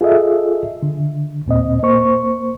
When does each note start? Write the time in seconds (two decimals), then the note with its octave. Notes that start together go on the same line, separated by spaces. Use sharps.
0.01 F4 G#4 A4 D#5 E5
0.83 D3
1.46 D#2 A#2 C4 D#5
1.83 A#3 C5 C#6